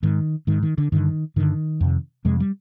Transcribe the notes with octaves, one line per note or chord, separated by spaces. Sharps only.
G#2 D#3
G#2 D#3
D#3
D3
G2 D3 D#3
G2 D3 D#3
F2 C3
F2 C3 G#3
G3